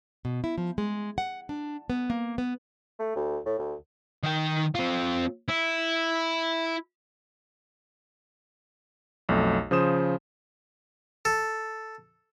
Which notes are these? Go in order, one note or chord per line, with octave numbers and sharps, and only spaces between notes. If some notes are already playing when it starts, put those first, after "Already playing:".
B2
E4
F3
G#3
F#5
D4
B3
A#3
B3
A3
D2
A2
D2
D#3 G5
C4 F4
E4
B1 F2 A3
C#3 F3 C5 D#6 E7
A4